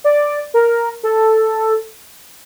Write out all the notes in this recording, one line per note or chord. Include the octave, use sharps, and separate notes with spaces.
D5
A#4
A4